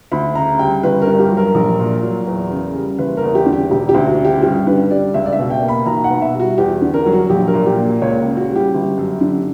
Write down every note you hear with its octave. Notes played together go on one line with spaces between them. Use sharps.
D2 B5
C#3 A#5
G3 G5
G1 B4
A#4
G2
G4
F#3
A#4
A#1
A#2
F#3
E2
C#3
G3
F#1 B4
A#4
E2
G4
D3
G4
E1 G4
G4
D2
F#4
C#3
G4
G2 G4
D3 B4
G3 D5
C#2 E5
D5
E5
B2
G5
A#3
B5
B1 A#5
F#5
B2
E5
G3
F#4
E2 G4
D3
A#4
F#3
F#4
A#1 G4
A#4
A#2
G4
A#3
C#2 C#5
C#3
F#4
G3
G4
G1
F#2
D3